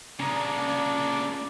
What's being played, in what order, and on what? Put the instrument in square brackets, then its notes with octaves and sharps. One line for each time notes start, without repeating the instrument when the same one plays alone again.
[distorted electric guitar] A#2 C#3 [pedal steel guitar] C#4 A#5 D#6 [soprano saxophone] D4 [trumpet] D6